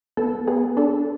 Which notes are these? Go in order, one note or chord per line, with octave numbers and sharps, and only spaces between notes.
B3 A4
B3 G#4
D4 A4